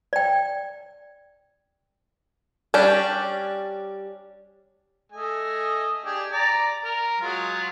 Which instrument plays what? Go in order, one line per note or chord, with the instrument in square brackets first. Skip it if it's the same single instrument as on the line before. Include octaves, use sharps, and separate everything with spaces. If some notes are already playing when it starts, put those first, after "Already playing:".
[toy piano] D5 G5
[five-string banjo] G3 C#4 D4 G4
[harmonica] A3 D#5 G#5
D4 G4 G#4
D5 A#5
A#4
F#3 G#3 F4